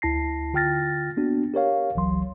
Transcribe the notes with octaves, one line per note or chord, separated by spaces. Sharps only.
D2 E4 A5 A#6 C7
D3 F4 G5 F6 A6 A#6
A#3 B3 D4 F#4
G4 A#4 C#5 F5
G1 C#2 E3 F#3 C6